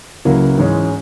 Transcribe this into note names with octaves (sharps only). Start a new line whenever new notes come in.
C#2 C#3 F#3 A#3 E4
G#2 E3 G#3 C#4